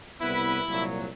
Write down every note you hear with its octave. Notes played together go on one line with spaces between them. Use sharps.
C2 B3 E4 B4
C2 A#2 F#3